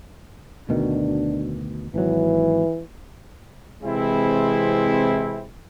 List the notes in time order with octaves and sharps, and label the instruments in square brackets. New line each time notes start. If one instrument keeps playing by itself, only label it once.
[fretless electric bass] D2 B2 D#3 [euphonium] D4
[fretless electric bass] G#1 F#3 [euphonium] E3
[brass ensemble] C3 E3 G#3 C4 E4